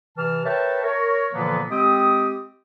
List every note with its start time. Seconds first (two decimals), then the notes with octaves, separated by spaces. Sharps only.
0.17 C3 E3 A5 F6
0.45 A#4 B4 C#5 E5 G5 A5
0.83 A#4 C#5
1.33 A#2 D3 E3 F3 A#3 B3
1.70 G#3 C4 G4 G5 D#6